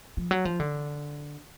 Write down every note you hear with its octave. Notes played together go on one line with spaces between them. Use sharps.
F3
F#3
F3
D3